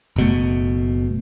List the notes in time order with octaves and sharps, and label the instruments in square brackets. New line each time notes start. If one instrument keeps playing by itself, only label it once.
[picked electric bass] F#1 B2 A3